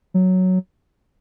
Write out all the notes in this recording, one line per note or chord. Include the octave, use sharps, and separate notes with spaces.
F#3